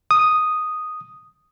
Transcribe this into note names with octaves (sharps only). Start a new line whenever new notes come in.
D#6